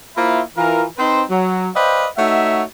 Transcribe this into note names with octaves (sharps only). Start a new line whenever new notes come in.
A#3 E4 F4 C5 E5 B5
E3 F4 A#4
C4 D#4 B4 C5
F#3
B4 C5 D5 D#5 F5 G5
A3 D#4 F#4 C#5 E5 F#5